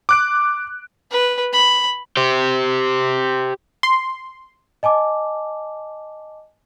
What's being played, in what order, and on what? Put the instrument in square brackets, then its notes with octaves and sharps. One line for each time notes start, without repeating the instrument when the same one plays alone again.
[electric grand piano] D6 F#6 D7
[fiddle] B4
B5
[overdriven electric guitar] G4 C5
[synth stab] C6
[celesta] D#5 G#5 A5 D6